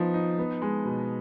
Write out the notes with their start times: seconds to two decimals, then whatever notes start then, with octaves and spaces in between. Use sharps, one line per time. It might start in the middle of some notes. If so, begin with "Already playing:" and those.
Already playing: F3 B3 D#4
0.14 D#4
0.38 B3
0.62 G#3
0.85 B2